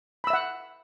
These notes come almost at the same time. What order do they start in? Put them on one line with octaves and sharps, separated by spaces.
B5 E6 E5 F#5